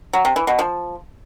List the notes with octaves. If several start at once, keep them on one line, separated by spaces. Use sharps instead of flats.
F#3
C3
E3
B2
F3